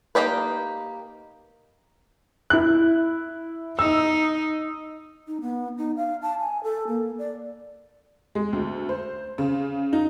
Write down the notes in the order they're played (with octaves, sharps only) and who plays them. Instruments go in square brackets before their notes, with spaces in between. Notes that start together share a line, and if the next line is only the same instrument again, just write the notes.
[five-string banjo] A#3 D#4 G4 B4
[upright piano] E4 F#6
[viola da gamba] D#4 [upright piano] E6
[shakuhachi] D#4
B3
D#4
F5
A5
G#5
A4
A#3
D5
[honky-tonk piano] G#3
D2
C5
C#3
D#4